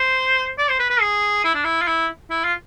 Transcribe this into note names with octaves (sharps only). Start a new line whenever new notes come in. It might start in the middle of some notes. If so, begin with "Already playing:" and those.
Already playing: C5
D5
C5
B4
B4
G#4
E4
D4
E4
F4
E4
E4
F4